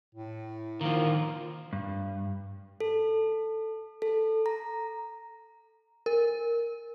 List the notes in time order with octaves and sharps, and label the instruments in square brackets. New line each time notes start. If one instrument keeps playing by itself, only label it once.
[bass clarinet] A2
[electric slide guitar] D#3 F3 [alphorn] A#3
[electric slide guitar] G2
[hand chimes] A4
A4
A#5
[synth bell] A#4